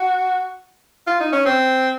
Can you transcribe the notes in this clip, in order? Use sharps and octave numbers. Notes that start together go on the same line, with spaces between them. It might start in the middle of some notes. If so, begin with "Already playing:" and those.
Already playing: F#4
F4
D#4
C#4
C4